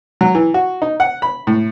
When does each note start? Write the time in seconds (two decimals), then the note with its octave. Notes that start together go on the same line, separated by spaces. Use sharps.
0.21 F#3
0.35 E3
0.54 F#4
0.82 D#4
1.00 F#5
1.22 B5
1.47 A2